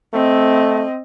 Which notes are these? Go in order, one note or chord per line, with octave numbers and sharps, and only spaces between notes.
A3 C4 D#5